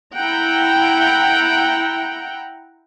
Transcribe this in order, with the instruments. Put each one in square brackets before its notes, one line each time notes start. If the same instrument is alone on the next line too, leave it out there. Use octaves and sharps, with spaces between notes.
[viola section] E4 F#5 G5 A#5